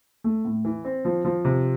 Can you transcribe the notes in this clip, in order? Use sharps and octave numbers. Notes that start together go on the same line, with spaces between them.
A3
A2
E3
C4
F3
F3
C3